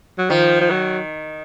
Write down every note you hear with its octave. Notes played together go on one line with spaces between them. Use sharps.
F#3
D#3 F3
F3
F#3